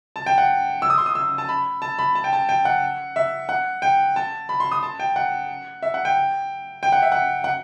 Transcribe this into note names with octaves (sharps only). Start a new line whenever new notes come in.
A5
G5
F#5
E6
D#6
C6
D#6
E6
A5
B5
A5
B5
A5
G5
A5
G5
F#5
E5
F#5
G5
A5
B5
C6
D#6
A5
G5
F#5
E5
F#5
G5
G5
F#5
E5
F#5
F#5